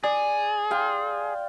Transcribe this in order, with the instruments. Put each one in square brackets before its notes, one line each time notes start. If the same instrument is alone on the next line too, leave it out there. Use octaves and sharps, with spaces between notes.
[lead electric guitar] G#4 [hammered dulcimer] D5
[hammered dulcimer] F5 G5 C6